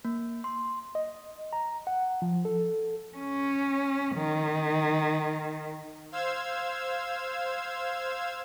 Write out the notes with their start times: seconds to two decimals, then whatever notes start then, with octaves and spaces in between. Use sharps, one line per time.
0.05 A#3
0.44 C6
0.95 D#5
1.53 A#5
1.87 F#5
2.22 F3
2.45 A4
3.18 C#4
4.16 D#3
6.12 C5 F5 E6 G#6